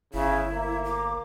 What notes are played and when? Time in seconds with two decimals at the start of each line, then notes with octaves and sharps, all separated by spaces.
0.14 G1 C#3 E4
0.53 A#3
0.85 D6